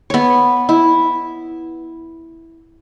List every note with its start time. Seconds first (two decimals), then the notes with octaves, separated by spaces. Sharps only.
0.10 B3 C#5
0.69 E4